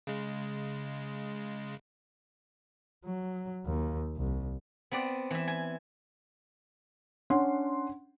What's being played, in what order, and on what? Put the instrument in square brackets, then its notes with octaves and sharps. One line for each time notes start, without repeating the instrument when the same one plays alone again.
[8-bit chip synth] C#3 G#3
[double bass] F#3
D#2
C2
[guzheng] B3 C4 B4 D5
E3 E5
G#5
[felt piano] C#4 D4 F#5 C6